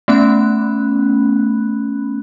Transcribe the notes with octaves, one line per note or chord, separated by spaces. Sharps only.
A3 B3 C#4 B5 F#6